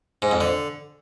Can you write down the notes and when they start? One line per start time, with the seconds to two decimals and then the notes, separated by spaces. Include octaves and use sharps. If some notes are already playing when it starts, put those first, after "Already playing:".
0.22 G#2
0.31 F2
0.41 D3